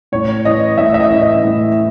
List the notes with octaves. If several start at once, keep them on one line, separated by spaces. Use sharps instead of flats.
A2 C#5
E3 D#5
A2 E5
E5
D#5
E3
D#5
A2